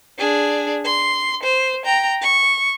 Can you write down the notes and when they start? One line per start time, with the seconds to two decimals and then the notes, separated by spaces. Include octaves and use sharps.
0.18 D4 G#4
0.85 C6
1.43 C5
1.85 G5 A#5
2.21 C#6